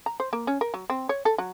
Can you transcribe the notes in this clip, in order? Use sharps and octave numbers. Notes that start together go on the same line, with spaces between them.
A#5
C5
A#3
C#4
A#4
F#3
C4
C#5
A4
F#3